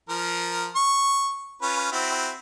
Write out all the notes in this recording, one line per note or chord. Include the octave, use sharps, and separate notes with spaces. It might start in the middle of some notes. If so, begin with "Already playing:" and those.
F3 A#4
C#6
C#4 F4 B4
C4 E4 F#4